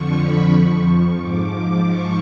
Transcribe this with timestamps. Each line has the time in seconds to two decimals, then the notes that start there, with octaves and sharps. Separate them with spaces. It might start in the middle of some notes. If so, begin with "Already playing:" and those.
Already playing: F2 D3 F3 C#6
0.19 B5
0.52 F2 F3 C#6
1.20 G#2 F3 D6
1.87 G#2 F3 C#6